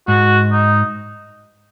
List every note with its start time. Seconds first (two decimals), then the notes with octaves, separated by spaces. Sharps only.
0.08 G#2 F#4
0.52 D#4